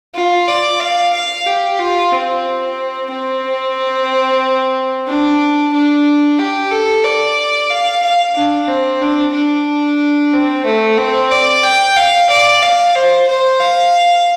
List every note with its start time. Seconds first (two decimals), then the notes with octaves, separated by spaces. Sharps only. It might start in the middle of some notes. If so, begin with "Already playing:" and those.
0.15 F4
0.48 D5
0.80 F5
1.14 F5
1.46 G4
1.79 F4
2.12 C4
3.11 C4
5.07 D4
5.73 D4
6.39 G4
6.71 A4
7.05 D5
7.71 F5
8.03 F5
8.35 D4
8.68 C4
9.01 D4
9.34 D4
10.33 C4
10.66 A3
10.98 C4
11.31 D5
11.64 G5
11.96 F5
12.30 D5
12.63 F5
12.95 C5
13.28 C5
13.61 F5